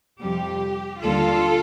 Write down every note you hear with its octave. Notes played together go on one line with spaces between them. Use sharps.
F2 C3 G3 G4
D#2 D3 G3 A#3 F4 A4